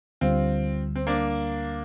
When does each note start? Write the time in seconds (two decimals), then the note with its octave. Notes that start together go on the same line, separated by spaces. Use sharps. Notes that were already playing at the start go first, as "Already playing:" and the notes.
0.21 D2 D3 G3 C4 F4
0.96 C4
1.07 A#3 D4